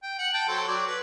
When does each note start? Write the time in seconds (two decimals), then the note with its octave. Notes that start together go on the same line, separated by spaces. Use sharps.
0.03 G5
0.18 F#5
0.33 G5 A5
0.48 F#3 A4 C5
0.68 F#3 D5
0.87 B4